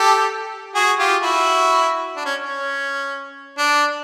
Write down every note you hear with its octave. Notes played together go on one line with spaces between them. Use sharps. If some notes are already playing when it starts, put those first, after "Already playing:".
Already playing: G4 A4
F#4 G#4
F4 G4
E4 F#4
D4
C#4
C#4
D4